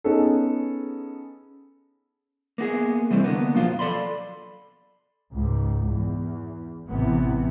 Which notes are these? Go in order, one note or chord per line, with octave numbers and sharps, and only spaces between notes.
B3 C#4 D#4 G#4 A4
A#3 B3 F#4 G#4
C3 E3 G3 A3 C4
D3 A#3 B3
F2 B2 F3 F#3 F4
A4 D5 B5 C6
C#2 G#2
E2
A1 C3 E3 B3